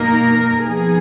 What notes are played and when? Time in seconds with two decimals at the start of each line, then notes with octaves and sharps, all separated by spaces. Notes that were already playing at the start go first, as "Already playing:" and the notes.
Already playing: B2 A#3 D#4 A#4
0.64 F3 B3 D#4 G#4